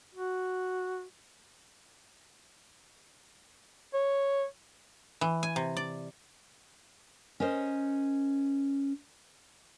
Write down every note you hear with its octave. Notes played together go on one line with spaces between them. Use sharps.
F#4
C#5
E3
G#5
C3
D5
C#4 A#4 C5 D#5